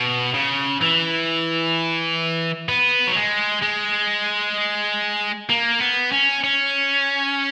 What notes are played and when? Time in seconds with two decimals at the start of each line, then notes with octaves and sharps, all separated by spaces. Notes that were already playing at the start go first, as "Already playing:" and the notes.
Already playing: B2
0.34 C#3
0.81 E3
2.69 B3
3.07 F#3
3.16 G#3
3.62 G#3
5.50 A#3
5.81 B3
6.12 C#4
6.44 C#4